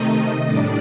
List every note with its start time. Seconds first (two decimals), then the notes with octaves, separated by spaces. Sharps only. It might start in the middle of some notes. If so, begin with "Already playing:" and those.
Already playing: C3 D#3 A3 D#4 D#5
0.46 A2 G3 D4 D5